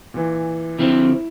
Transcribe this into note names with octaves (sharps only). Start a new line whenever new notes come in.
A#2 E3
D3 F3 C4 E4